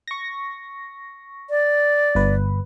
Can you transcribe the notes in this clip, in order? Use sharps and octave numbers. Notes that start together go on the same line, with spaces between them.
C#6 A#6
D5
G1 B4